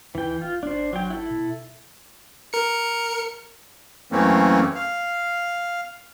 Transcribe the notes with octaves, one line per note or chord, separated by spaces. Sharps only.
D#2 E3 G5
D1 F4
G#1 D4 C5
F#3 G5
E4 A4
B2
A#4 C#7
F#2 E3 A3 A#3 C4 C#4
F5